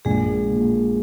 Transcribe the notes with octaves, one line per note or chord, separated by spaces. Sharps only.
A#1 G#3 G#4
A#2